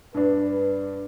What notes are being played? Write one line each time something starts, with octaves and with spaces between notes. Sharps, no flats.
G2 D4 B4